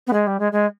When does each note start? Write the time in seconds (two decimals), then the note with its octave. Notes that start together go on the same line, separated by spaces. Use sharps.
0.07 B3
0.13 G#3
0.27 G3
0.39 G#3
0.52 G#3